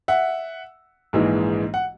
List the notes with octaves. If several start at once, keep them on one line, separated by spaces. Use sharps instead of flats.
E5 F#5
A#1 G#2 E3 G#3
F#5